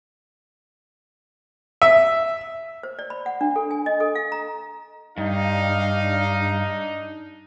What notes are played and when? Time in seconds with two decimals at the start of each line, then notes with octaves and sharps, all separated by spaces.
1.82 E5
2.83 C5
2.99 D5
3.10 B5
3.26 F#5
3.41 D4
3.56 A4
3.71 G#5
3.86 D#5
4.00 A4
4.15 F5
4.32 A#5
5.18 G2 D4 D#4 F5